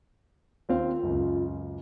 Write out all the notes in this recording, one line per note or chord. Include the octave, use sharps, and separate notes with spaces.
D#2 C4 F4 F5
C#2 F#2